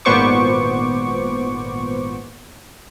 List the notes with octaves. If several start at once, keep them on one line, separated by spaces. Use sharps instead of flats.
G#1 A#2 B3 C5 C#6 D6